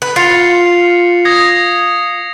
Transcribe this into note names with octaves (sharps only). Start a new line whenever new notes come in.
B4
F4 C7 C#7 F7
D#6 G#6 A#6